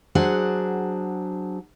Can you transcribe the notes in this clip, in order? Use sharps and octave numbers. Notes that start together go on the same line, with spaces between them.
F#3 D4 G#4 C5 F#5